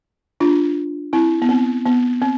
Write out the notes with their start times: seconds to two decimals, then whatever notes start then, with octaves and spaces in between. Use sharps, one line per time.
0.40 D4 F4
1.13 C4 E4
1.42 B3
1.49 C4
1.86 B3
2.22 C4